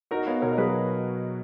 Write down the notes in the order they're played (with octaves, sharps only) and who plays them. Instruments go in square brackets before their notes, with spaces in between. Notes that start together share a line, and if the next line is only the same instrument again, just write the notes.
[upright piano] D#4 [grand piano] F#4 A#4
[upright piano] B3 [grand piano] C#5 F5
[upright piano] B2 [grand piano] A#4 C#5
[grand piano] A#4
[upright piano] F#3 [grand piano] G#4 B4